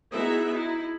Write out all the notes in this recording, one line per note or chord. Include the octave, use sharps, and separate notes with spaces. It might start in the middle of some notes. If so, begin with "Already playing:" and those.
B3 D#4 E4 F#4 G#4 E5
D#4 E4